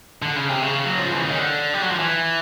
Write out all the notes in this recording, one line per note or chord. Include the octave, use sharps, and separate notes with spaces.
D3
C#3
C3
C#3
F#3
F3
E3
D#3
D3
G3
F#3
F3
E3